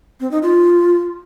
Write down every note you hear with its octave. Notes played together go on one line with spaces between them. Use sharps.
C4
D#4
F4